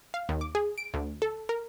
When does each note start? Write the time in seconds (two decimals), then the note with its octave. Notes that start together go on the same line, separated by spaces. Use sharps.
0.14 F5
0.29 D#2
0.41 D6
0.55 G#4
0.78 D7
0.94 D2
1.22 A4
1.49 A#4